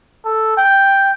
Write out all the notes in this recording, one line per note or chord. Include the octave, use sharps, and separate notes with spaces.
A4
G5